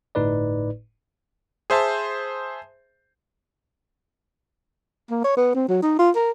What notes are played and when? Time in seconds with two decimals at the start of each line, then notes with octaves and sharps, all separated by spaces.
0.15 G1 A2 D#4 B4 D5
1.70 G#4 C5 E5 A5
5.11 A#3
5.24 C#5
5.37 B3
5.55 C4
5.69 F#3
5.82 D#4
5.99 F4
6.16 A#4